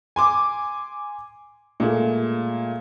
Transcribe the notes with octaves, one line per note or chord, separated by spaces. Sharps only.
G#5 C6 D6
A#2 G#3 A3